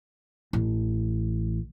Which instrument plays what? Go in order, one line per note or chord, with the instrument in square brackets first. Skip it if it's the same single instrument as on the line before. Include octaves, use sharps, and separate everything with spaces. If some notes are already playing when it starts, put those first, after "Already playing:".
[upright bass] A1